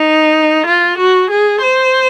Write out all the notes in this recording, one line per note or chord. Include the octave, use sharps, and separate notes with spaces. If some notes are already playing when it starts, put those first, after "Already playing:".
Already playing: D#4
F4
F#4
G#4
C5